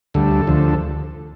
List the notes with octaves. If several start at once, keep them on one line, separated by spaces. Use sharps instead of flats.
D2 D3 G3 A4
D2 D3 F3